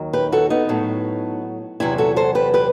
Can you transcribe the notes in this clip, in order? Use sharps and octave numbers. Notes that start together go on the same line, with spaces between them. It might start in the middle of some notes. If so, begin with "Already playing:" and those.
Already playing: D#2 D#3 F#3
G4 B4
F#4 A4
B3 D#4
A2 F#3
E2 C3 F#3 E4 G4
F#4 A4
A4 C5
G4 B4
G4 B4